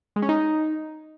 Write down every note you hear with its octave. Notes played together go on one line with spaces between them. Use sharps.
G#3
C#4
D#4